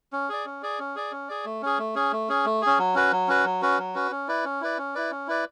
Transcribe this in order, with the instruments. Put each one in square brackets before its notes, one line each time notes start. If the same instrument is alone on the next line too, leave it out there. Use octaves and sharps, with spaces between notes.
[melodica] C#4
G#4 D5
C#4
G#4 D5
C#4
G#4 D5
C#4
G#4 D5
A3
C#4 G#4
A3
C#4 G#4
A3
C#4 G#4
A3
C#4 G#4
F#3
C#4 F#4 B4
F#3
C#4 F#4 B4
F#3
C#4 F#4 B4
F#3
C#4 F#4 B4
C#4
E4 B4 D5
C#4
E4 B4 D5
C#4
E4 B4 D5
C#4
E4 B4 D5